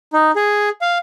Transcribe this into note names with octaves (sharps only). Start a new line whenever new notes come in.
D#4
G#4
F5